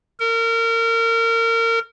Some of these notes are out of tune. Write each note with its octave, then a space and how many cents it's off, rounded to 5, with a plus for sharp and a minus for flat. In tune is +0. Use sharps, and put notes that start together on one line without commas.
A#4 -30